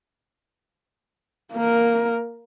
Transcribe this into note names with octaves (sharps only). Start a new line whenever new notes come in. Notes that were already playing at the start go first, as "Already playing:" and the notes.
A#3 A#4